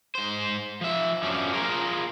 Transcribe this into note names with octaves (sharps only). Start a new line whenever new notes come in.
G#2 C5
F3 E5
F#2 F3 C#4 D4
F4 G#4 A#4